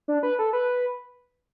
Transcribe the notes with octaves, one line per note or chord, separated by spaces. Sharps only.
D4
B4
A4
B4